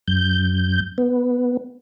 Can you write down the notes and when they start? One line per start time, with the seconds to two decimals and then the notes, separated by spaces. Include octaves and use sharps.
0.08 F#2 G6
0.98 B3